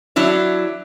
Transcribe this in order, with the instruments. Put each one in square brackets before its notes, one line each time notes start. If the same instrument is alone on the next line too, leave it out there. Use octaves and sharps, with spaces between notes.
[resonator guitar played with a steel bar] F#3 D4 E4 C#5